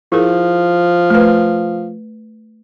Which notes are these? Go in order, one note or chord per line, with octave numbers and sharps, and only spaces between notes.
F3 E4 G#4 A#4
A3 B4